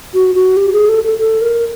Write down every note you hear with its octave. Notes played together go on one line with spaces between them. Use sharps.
F#4
F#4
G4
G#4
A4
A4
A4
A#4